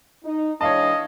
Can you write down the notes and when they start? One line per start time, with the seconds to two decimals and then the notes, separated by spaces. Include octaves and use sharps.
0.24 D#4
0.61 E3 G#3 D4 C#5 D#5 F5 A5